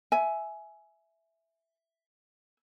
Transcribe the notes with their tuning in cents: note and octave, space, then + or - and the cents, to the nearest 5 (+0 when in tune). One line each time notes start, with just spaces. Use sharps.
E5 +0 G#5 +15